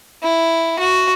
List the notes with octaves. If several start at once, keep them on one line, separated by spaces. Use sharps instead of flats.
E4
F#4